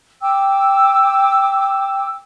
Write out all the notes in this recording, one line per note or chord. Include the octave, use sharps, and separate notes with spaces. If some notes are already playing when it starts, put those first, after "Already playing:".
G5 D6 E6